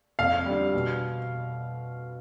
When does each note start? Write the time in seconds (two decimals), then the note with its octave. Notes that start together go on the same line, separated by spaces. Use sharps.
0.19 F2 F5
0.46 D3 G3
0.73 B2